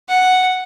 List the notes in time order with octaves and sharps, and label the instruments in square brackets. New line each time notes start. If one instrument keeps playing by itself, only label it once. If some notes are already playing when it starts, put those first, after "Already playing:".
[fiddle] F#5